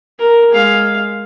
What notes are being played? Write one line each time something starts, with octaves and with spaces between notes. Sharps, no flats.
A#4
G#3 F5